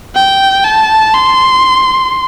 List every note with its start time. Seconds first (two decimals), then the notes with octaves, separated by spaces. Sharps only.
0.15 G5
0.64 A5
1.14 C6